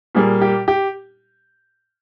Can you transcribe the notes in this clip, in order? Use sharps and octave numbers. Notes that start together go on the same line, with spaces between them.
A#2 G3 A#3 G#4
G4
G4